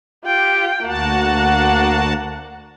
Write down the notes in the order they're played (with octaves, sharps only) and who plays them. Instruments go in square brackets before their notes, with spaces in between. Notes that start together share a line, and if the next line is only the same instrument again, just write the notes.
[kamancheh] F4 G5 [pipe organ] G4
[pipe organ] D2 F#4 A5 [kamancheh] A#3 F#5